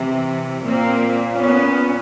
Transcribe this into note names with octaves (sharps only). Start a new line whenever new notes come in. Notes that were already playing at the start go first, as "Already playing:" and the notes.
Already playing: C3 E3
A#2 A#3 C4
B3 C#4